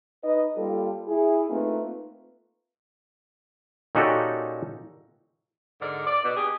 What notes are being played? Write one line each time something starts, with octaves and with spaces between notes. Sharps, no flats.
D#4 B4 D#5
G3 A#3 F4 A4
E4 G#4
A3 A#3 C4 D#4 F4 B4
A#2 C#4 D#4 F#4 G4 A4
G#2 D3 A#4 D5
D5
B2
D4 G4 G#4